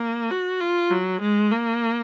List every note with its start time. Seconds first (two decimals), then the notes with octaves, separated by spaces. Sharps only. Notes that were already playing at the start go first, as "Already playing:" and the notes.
Already playing: A#3
0.31 F#4
0.60 F4
0.90 F#3
1.21 G#3
1.51 A#3